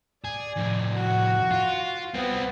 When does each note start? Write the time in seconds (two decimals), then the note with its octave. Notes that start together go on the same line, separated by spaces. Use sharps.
0.24 G#4 D5
0.56 F2 A2
0.92 F#4
1.51 F4
2.14 G3 B3 C4